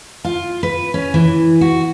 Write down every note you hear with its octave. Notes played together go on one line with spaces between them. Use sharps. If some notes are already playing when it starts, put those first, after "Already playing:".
F4
B4
C#4
E3
F#4